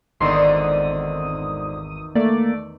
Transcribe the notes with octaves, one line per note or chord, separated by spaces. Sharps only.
G#1 E2 A#2 D3 D#3 C4 C6 D#6
A3 A#3 D5